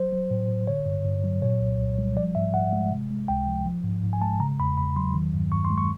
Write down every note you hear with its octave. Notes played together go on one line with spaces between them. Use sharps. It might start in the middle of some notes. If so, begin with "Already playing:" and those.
Already playing: F#3 C5
F#3
A2
A2
D3 C#5
G2
G2
F#3
A#2 C#5
C2
C2
G3
F3 D5
G#2 E5
G#2 F#5
G#3
C3
G#3
C#2 G5
F3
F3
G#2
G#2
G#5
G#3 A5
C#3 A#5
E2 B5
E2 B5
F#3 C6
D#3
G2
G2 C#6
C6
G#3
C#6